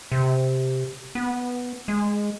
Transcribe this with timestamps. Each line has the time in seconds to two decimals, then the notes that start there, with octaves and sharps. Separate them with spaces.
0.12 C3
1.15 B3
1.88 G#3